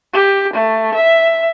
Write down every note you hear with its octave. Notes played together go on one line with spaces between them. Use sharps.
G4
A3
E5